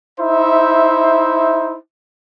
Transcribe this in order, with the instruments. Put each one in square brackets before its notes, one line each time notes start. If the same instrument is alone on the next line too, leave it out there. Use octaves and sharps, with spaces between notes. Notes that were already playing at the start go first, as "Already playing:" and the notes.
[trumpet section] D#4 E4 C5 E5